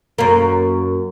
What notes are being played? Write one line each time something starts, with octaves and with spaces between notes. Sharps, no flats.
F#2 A#3